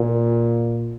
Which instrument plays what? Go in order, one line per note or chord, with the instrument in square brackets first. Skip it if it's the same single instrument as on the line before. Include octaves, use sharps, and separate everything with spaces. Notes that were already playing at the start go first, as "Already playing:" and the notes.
Already playing: [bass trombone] A#2